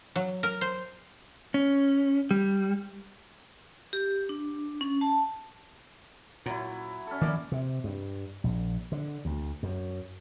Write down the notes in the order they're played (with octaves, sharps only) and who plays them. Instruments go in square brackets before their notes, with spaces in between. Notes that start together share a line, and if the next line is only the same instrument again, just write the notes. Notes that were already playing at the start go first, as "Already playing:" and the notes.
[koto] F#3
A#4
C5
[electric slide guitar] C#4
G3
[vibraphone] G4
D4
C#4
A5
[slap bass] A#2 [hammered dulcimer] F#3 E4
[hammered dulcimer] C#4 A4
[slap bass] D#3 F3 A#3 [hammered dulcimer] D5
[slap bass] C3
G2
A#1
D3
D2
F#2